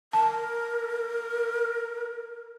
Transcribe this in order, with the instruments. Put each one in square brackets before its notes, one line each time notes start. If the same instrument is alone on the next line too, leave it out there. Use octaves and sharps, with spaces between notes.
[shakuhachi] A#4 [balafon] A5